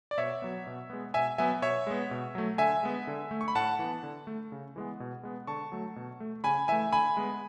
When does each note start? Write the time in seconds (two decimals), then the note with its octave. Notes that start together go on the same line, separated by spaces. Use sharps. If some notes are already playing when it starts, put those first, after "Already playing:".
0.11 D5
0.18 B2 C#5 E5
0.42 F#3 B3
0.67 B2
0.90 G#3 B3
1.14 B2 E5 G#5
1.38 F#3 B3 E5 G#5
1.62 B2 C#5 E5
1.87 G#3 B3
2.11 B2
2.35 F#3 A3
2.58 D3 E5 G#5
2.83 G#3 B3
3.07 D3
3.31 A3
3.41 C#6
3.48 B5
3.55 A2 F#5 A5
3.79 E3 B3
4.03 D3
4.27 A3
4.52 C#3
4.76 E3 G#3 B3
5.00 B2
5.23 G#3 B3
5.47 D3 A5 C#6
5.72 F#3 A3
5.96 B2
6.20 A3
6.44 C#3 G#5 B5
6.68 E3 A3 E5 G#5
6.92 D3 G#5 B5
7.17 G#3 B3